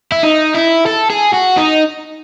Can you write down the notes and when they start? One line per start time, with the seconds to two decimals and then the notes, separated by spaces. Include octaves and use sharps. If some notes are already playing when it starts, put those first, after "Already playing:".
0.12 E4
0.23 D#4
0.55 E4
0.86 A4
1.10 G#4
1.34 F#4
1.58 D#4